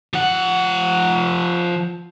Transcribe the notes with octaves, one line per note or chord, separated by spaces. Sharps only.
F3 F#5